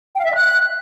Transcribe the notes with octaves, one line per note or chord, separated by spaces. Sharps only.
G5
F5
E5
D#5
F#6